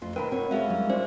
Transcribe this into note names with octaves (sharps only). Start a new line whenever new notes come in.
F2 A3 F4
B2 D#3 A#4 B4 G5 A5 B5
B2 C4 F4 C#5
G#3 C#4 F#4 G#4 C#5 E5 F5
F#3 G3 D#4
C#4 F4 C5 D5